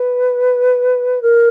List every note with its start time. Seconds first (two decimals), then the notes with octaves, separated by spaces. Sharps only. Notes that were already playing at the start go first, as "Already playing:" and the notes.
Already playing: B4
1.21 A#4